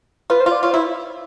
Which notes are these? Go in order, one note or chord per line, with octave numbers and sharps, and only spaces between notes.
F4 B4
C5
F4
D5
F4 C#5
C5
E4